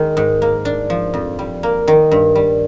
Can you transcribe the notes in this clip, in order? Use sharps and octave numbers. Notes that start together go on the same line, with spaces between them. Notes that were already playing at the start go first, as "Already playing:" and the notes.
Already playing: D#3 G#3
G#2
A#3
D4
F3
F2
G3
A#3
D#3
G2
G3